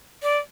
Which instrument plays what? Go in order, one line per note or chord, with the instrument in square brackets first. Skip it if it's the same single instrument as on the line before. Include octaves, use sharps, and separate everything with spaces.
[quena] D5